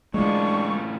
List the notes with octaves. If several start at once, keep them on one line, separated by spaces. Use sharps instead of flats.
A2 E3 G#3 D4 F4 C#6